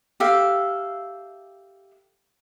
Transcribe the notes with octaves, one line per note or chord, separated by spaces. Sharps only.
G4 A4 E5 F5